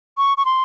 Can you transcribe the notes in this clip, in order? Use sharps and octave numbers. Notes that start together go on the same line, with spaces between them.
C#6
C#6
C6